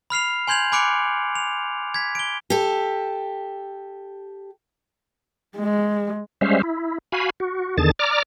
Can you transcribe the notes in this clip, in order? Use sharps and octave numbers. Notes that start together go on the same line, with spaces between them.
B5 F6 C7 F7
G#5 C6 G6 G#6 F7 F#7
G#5 B5 D6 F#6 C#7 D7
F7
G#6 B6
D7 G7
G4 A4
G#3
G3 G#3 C#4 C5 E5 F5
E4
F#4 F5 G#5 B5
F#4
E2 D3 D#3 G#4 A5 A6
D5 A#5 D6 F6